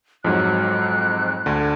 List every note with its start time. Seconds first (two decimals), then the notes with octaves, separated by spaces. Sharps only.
0.24 F2 G#2 F#3 F#6
1.46 D2 D3